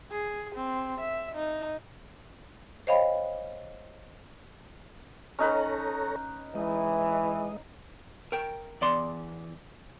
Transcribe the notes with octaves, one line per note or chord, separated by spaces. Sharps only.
G#4
C4
E5
D#4
C5 C#5 D#5 F5 G5 B5
C#4 D#4 A4 B4 C#5 A#5
E3 G#3 D#5
A#4 G5
E2 D5 C6